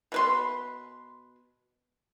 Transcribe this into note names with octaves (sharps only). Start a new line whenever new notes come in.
B2 B4 C6